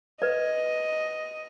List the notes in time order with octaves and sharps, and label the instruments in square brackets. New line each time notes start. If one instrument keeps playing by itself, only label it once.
[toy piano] B4 D5 [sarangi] D#5